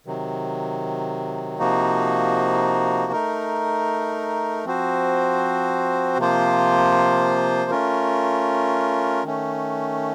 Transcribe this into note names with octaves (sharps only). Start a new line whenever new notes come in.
C3 D#3 F#3
C3 F3 A#3 D#4 F#4
A3 D#4 A#4
F3 C4 F#4 C5
C3 F3 A#3 F4 C5
A3 C#4 F4 A#4
D#3 A3 C#4